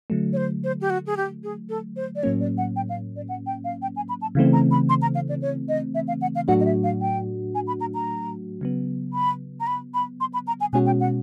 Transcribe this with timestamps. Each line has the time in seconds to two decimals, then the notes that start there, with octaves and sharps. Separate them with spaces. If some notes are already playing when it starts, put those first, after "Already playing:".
0.10 D3 F#3 A3
0.33 C#5
0.37 C5
0.64 C5
0.81 G4
0.90 F#4
1.07 G#4
1.17 G4
1.44 G#4
1.69 A4
1.96 C5
2.16 D5
2.23 A2 F#3 A#3 C#4 C#5
2.40 D5
2.58 F#5
2.76 G5
2.89 F5
3.16 D5
3.29 F#5
3.46 G5
3.64 F5
3.82 G5
3.96 G#5
4.09 B5
4.22 A5
4.35 C#3 E3 A3 C4 F5
4.53 A#5
4.71 B5
4.89 C6
5.02 A#5
5.15 F5
5.29 D5
5.42 C#5
5.69 D#5
5.95 E5
6.08 F5
6.22 F#5
6.35 F5
6.48 A2 F#3 A3 D4 F#4 F#5
6.60 D#5
6.65 E5
6.84 F5
7.01 G5
7.55 G#5
7.67 B5
7.81 A#5
7.95 A#5
8.61 C#3 F#3 B3
9.13 B5
9.60 A#5
9.67 B5
9.94 B5
10.20 C6
10.34 B5
10.47 A#5
10.61 G#5
10.73 B2 G#3 C#4 F#4 G#5
10.86 G5
11.00 F#5